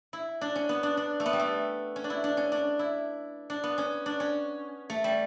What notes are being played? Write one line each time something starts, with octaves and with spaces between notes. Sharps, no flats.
E4
D4
C#4
B3
D4
D4
A3
B3
G3
A3
C#4
D4
E4
D4
C#4
D4
E4
D4
B3
C#4
D4
C#4
A3
G3